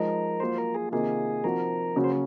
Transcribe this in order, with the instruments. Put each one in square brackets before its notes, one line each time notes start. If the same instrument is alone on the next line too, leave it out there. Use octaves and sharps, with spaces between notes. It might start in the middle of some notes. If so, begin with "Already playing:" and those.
Already playing: [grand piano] F3 G#3 D#4 [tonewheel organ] A#4
[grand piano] F#3 A#3 F4 [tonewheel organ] C5
[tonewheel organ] A#4
G#4
[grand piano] C3 D#3 A#3 F4 [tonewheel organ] G#4
[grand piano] F3 C4 D#4 F#4 [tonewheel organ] A#4
[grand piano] C#3 F#3 A#3 C#4 F#4
[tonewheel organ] C5